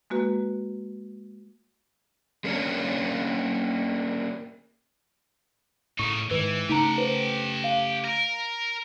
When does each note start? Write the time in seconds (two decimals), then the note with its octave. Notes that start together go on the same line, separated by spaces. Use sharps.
0.10 G#3 A#3 F#4 B4
2.44 G#3 A#3 C#4 D4 A#4 C#5
5.99 A2 C#3 D#4 C#6
6.31 G#2 D#3 E3 B4
6.69 C#3 A3 D#4 G4 F#5 A#5
6.98 B4 C5
7.64 F5
8.04 A#4